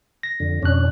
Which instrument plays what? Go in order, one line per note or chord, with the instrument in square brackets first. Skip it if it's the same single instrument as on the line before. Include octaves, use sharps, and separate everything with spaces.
[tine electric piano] A#6
[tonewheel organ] F2 D3
[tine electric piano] F2 B2 F#6 [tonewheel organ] C#4 D4